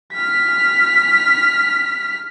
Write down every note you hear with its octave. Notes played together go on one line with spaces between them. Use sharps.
F6 B6